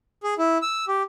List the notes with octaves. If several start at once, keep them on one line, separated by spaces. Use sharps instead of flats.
G#4
E4
E6
G4